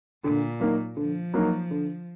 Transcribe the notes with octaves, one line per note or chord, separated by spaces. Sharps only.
A#2 D3
F#3 A#3 D#4
D3 F3
F#3 A#3 D#4
D3